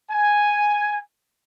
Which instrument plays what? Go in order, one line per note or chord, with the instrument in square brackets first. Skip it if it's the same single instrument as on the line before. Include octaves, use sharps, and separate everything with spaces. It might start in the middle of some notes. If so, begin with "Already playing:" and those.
[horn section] G#5